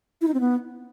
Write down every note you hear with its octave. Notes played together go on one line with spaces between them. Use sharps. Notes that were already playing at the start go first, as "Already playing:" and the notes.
E4
D#4
C4
B3